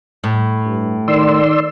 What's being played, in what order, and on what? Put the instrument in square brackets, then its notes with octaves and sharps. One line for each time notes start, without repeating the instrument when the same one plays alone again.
[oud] A2
[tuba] G2
[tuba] D#3 [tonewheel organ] D5 C6 E6